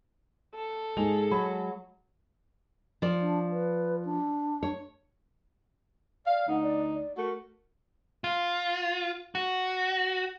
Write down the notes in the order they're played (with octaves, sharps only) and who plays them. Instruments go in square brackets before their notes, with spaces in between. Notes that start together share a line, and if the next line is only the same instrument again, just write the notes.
[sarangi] A4
[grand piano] G#2 G#4 F7 [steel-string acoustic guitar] G#3
[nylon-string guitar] F#3 [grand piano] B5
[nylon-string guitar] F3 D5
[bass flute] D4
B4
D4
[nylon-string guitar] C#5
[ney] D5 [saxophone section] F5
[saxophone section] D2 D#4 [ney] F#5
[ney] D5
D5
[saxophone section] A3 F#4 [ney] A#4
[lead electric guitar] F4
F#4